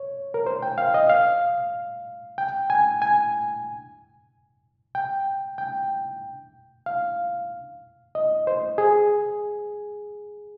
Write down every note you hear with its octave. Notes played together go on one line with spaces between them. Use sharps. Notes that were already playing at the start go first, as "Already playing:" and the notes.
Already playing: C#5
A#4
C5
G5
F5
D#5
F5
G5
G#5
G#5
G5
G5
F5
D#5
C5
G#4